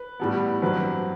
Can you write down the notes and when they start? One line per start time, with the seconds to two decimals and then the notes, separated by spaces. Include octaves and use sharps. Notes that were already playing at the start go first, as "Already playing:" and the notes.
Already playing: B4
0.20 A2 G3 B3
0.62 G2 F#3 C4 B4